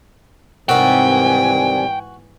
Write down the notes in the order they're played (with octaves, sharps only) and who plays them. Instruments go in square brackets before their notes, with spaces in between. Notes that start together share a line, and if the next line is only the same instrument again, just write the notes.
[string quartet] G#2 E3 G#5 [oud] C3 D#3 G3 [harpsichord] F#4 [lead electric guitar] G5